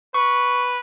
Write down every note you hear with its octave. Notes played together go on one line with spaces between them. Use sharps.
B4 C#6